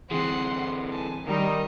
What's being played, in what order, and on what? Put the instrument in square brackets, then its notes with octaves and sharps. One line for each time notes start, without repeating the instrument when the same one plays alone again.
[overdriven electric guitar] D3 E3 [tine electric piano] C4 G#4 [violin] F#5 C6
[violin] G#5 A5
[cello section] D#3 G3 D#4 [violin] A#4 D#5